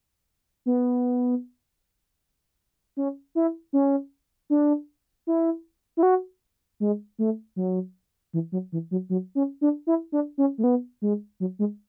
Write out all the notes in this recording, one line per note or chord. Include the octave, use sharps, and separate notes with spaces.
B3
C#4
E4
C#4
D4
E4
E4
F#4
G#3
A3
F#3
E3
F#3
E3
F#3
F#3
C#4
D4
E4
D4
C#4
A3
B3
G#3
F#3
G#3